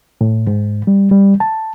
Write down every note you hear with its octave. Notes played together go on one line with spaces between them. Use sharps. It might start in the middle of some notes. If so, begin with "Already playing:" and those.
A2
G#2
G3
G3
A5